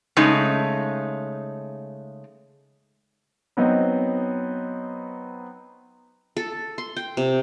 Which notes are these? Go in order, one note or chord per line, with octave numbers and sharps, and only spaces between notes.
C#3 G#3 A3 D#4
F#3 B3 C4 D#4
A4
C6
G5
C3